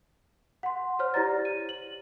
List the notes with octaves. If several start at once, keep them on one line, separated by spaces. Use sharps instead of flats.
F#5 C6
C5 C#5 F6
E4 G4 C5 D5 A#5 A6
D#7
F#7